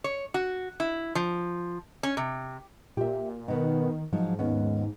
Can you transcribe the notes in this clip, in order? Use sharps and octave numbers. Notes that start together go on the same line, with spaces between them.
C#5
F#4
E4
F3
C#4
C3
A#2 G4 E5
B2 D#3 B3
G#2 F3 F#3 D#4
D#2 B3 C#4